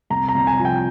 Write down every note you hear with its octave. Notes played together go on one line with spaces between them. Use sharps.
C2 A#5
A#5
C2
G#5
F3
G5